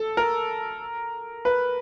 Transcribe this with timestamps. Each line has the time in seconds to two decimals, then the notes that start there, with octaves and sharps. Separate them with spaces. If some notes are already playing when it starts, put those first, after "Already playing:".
Already playing: A4
0.17 A#4
1.45 B4